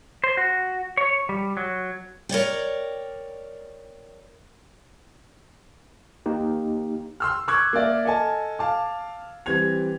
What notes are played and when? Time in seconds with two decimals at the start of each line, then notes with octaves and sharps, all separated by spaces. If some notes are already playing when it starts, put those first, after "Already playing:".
0.24 C5
0.37 F#4
0.97 C#5
1.29 G3
1.57 F#3
2.29 A#4 C#5 D5 G5
6.26 A#3 D#4 G4
7.20 C6 E6 F6
7.48 C#6 D6 E6 F#6 G#6
7.73 A#3 A#4 D5 E5
8.05 A4 D#5 G#5 A5
8.59 F5 A5 D6
9.46 E3 G3 C4 G#6 F7